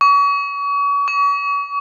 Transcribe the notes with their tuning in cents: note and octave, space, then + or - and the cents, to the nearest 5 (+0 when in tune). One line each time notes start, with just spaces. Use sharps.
C#6 +40
C#6 +45